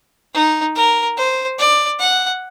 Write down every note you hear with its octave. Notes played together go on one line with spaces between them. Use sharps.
D#4
A#4
C5
D5
F#5